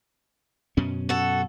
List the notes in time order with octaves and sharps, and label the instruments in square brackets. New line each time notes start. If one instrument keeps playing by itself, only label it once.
[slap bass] F#2 B2 C#4
[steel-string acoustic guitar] F#4 A4